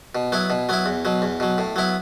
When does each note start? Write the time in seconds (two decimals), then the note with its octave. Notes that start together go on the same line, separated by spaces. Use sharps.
0.15 B2
0.32 F#3 B3 E4
0.50 B2
0.69 F#3 B3 E4
0.86 E2
1.05 B2 F#3
1.22 E2
1.40 B2 F#3
1.58 A2
1.76 F#3 B3 E4